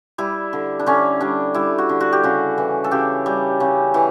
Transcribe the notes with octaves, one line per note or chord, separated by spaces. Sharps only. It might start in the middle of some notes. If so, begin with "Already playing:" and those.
G3 E4
D3
D4
D3 C#4
G3 D4
G3 E4
F#4
D3
F#4
G4
C#3 F#4
E3
A4
C#3 G4
G3
C#3
E3